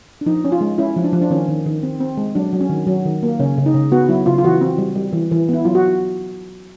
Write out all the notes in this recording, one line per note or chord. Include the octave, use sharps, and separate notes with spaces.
D4
F3 D#4
C#4
F4
G#3
C#4 E4
F3
D4
F3
D4
D#3 C#4
D#3
D#3
C4
C4
G#3
F#3 D4
F#3
C#4
D#3
F#3
D#3
A#3
C#3 C#4
C#3
D#4
C#3
B3 F#4
F#3 E4
C#3 F4
F4
E3 F#4
C4
G3
G3
E3
E3
B3 E4
F#3 F4
F#4